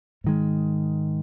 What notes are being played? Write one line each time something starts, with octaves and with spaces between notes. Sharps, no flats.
G#2 D#3 G#3